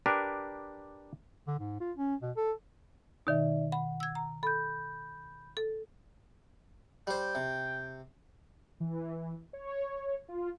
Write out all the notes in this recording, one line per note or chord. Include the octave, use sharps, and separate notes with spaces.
D4 G4 A#4 B4
D3
G#2
F4
C#4
B2
A4
B2 D#3 D#4 D5 E5
F#5 B5
E6 G#6
A#5
A4 B5 G6
A4
G3 C5 G5
C3
E3
C#5
F4